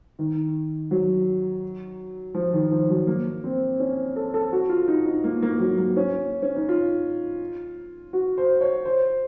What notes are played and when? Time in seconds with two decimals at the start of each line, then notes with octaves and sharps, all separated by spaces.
0.19 D#3
0.91 F#3
2.34 F3
2.53 D#3
2.72 F3
2.90 F#3
3.07 A#3
3.44 C4
3.80 C#4
4.16 A4
4.34 A4
4.52 F#4
4.69 F4
4.88 D#4
5.06 D#4
5.24 A#3
5.42 A#3
5.60 F#3
5.78 A#3
5.96 C#4
6.42 C#4
6.56 D#4
6.69 F4
8.13 F#4
8.37 C5
8.61 C#5
8.85 C5